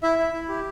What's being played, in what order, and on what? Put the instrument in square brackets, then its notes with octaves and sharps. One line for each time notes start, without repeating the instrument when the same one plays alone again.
[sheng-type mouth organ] E4 E5
E4
E4
G4